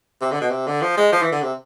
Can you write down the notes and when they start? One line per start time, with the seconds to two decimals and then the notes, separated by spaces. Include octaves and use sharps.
0.21 C3
0.32 D3
0.41 B2
0.51 C3
0.67 D3
0.82 F3
0.97 G#3
1.13 F3
1.23 E3
1.32 D3
1.42 C3